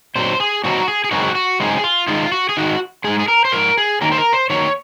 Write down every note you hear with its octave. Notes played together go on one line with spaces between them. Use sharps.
A#2 F#3 C4 D#4 C5
G#4
A#2 F#3 C4 D#4 F#4
G#4
G#4
F#2 C#3 G#3 C4 D#4 F#4
F#4
F#2 C#3 G#3 C4 D#4 G#4
F4
G#2 D#3 G#3 D#4 F4
F#4
G#4
G#2 D#3 G#3 D#4 F#4
G#2 F3 G#3 G#4
G#4
A#4
C5
G#2 F3 A#4
G#4
D#3 F#3 A#3 A#4
C5
A#4
C5
D#3 F#3 A#3 C#5